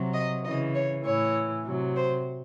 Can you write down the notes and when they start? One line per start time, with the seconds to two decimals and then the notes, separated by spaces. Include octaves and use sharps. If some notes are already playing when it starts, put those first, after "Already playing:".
Already playing: C3 F#3
0.14 D#5
0.44 C#3 E3 D#5
0.74 C#5
1.05 A2 E3 C#5
1.66 C3 F#3
1.96 C5